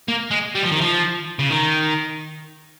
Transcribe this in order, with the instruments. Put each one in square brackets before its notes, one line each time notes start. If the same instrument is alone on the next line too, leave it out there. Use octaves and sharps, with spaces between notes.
[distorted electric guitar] A#3
G#3
G3
F3
D#3
F3
C#3
D#3